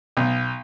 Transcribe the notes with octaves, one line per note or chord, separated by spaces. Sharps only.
B1